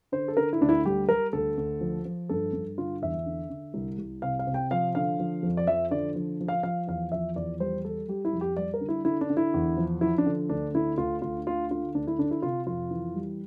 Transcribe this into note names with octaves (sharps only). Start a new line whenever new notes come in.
D3 C5
A4
D3 A#4
E4
D2 D4
E4
G3 G4
G3 A#4
D2 A4
D2
F3
F3
G2 A4
G2
D3 F4
E2 E5
D3
D3
C2
C2
C3 F5
F5
C3
G5
F3 F5
D3 F5
F3
F2
D5
F3 E5
D3 D5
F3
F3
F5
F3 F5
E2 F5
F3 E5
E2 D5
G3 C5
G3 A4
G3 G4
E4
F2
G4
G3 D5
A#4
D3
E4
D3 E4
D4
D3
E4
E2
F3
F3 E4
D4
D3
D2 D4
D3 E4
D2 F4
D2 F4
D3 F4
D3 F4
D2 D4
E4
D3 D4
E4
C3 F4
F2 F4
E3
G3